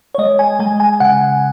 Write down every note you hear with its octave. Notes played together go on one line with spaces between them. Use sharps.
C#5
G#3 D#5
G#5
G#3 G#5
G#5
C#3 F#5